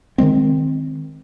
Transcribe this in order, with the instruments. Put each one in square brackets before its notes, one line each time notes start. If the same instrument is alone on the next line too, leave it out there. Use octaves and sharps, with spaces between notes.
[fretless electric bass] D#3 E3 G#3 C4